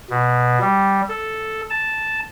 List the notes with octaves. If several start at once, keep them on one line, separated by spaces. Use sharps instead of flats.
B2
G3
A4
A5